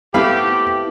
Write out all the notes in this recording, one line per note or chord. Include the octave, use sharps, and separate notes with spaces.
A3 B3 C4 E4 G4 F5 B5